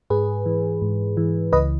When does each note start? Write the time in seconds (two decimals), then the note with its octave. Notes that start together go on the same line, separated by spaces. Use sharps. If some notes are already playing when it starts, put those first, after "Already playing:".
0.10 G#2 G#4 B4
0.46 E3
0.82 G#2
1.17 E3
1.52 C#2 B4 D#5